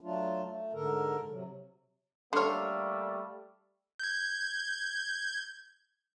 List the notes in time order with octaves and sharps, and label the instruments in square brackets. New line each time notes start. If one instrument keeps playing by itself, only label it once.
[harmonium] F#3 A3 D4 F4
A3
G#2 D3 A4 A#4
C3 F#3
[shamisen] D3 C#5 [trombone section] G3 A3 A#3 [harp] C6 F6
[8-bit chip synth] G6 G#6